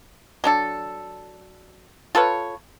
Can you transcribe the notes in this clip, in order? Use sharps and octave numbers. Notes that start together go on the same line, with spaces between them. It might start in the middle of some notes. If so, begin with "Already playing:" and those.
F#3 D4 A4
F4 A4 B4 C#5